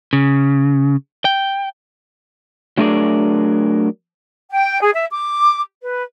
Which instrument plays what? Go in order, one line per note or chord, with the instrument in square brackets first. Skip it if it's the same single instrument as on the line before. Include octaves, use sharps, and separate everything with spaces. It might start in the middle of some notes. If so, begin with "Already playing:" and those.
[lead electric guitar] C#3
G5
[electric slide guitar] F#3 A3 D4 G#4 A#4 D5
[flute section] G5
G#4
E5
D6
B4